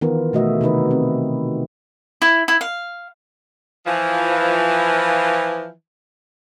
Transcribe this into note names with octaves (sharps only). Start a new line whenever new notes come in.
D#3 E3 B3 F4 A#4
B2 A3 F#4 D#5 E5
C3 D#3 D#4 B4
C4
E4
E4
F5
E3 F3